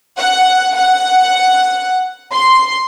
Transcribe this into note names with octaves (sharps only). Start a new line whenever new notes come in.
F#5
F#5
C6